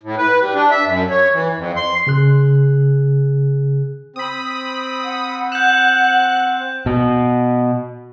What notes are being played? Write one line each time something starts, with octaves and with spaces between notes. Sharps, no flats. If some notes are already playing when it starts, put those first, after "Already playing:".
A2
B4
G3
D4
E5
F#2
C#5
E3
F2
C6
C#3 G#4 F#6
C4 B5 D#6
F#5
F#6 G6 E7
B2